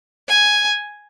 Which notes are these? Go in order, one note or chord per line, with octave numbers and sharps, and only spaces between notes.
G#5